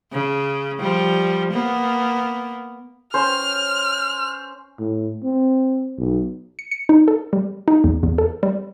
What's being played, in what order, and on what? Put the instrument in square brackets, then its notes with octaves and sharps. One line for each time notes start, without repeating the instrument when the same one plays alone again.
[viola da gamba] C#3
F3 G3
A#3 B3
[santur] C#4 C5 [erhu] F6
[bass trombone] A2
C4
B1
[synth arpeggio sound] C#7
C#7
D#4
A4
G3
D#4
E2
E2
A4
G3